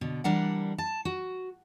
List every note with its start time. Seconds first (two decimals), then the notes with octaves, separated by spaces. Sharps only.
0.01 B2 D3
0.24 E3 G3 D4 A#4 F#5
0.78 A5
1.05 F#4